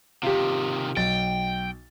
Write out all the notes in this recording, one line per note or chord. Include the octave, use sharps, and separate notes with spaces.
C3 D#3 F4 G4
B1 G5 A6